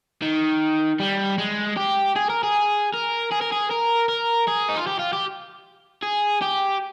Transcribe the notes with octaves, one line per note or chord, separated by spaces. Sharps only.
D#3
G3
G#3
G4
G#4
A#4
G#4
A#4
G#4
A#4
G#4
A#4
A#4
G#4
D#4
F4
G4
F4
G4
G#4
G4